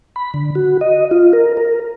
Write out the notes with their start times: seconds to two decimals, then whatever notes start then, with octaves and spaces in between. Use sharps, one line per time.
0.16 B5
0.34 D3
0.55 F#4
0.81 D#5
1.11 F4
1.33 A#4
1.57 A#4